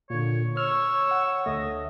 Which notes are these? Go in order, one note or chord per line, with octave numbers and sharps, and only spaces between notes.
A#2 D3 C#5
C#5 E6 F6
F#5
D2 A3 D#5